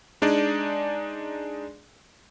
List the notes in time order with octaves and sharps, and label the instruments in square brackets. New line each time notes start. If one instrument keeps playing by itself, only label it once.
[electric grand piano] G#3 D4 D#4 G#4 D5